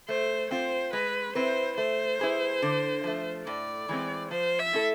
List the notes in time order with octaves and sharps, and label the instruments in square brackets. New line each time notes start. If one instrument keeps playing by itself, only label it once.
[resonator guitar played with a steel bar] A3 [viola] C5
[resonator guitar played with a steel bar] C4 F4 [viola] C5
[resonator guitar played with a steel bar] G#3 [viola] B4
[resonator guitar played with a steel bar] C4 E4 B4 [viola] C5
[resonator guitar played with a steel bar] A3 [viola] C5
[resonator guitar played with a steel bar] E4 G#4 B4
D3
F3 A3
[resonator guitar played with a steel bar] A2 [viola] D5
[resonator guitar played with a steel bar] E3 G#3 C4
[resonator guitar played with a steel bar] F3 [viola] C5
[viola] E5
[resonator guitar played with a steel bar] A3 E4 A4